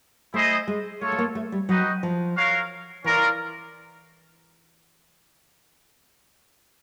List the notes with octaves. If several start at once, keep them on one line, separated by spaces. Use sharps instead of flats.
A3 E4 G#4 C5 D#5
G#3
A3 F4 A4 C#5
A3
A#3
A3
G3
F#3 D#4 F#4 B4 D#5 G5
F3
F#4 A#4 C#5 F5
E3 C#4 F4 A#4 D5